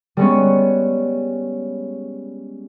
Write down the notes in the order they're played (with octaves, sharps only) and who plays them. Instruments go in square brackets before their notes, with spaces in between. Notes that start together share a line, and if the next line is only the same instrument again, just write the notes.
[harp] G3 G#3 B3 C#4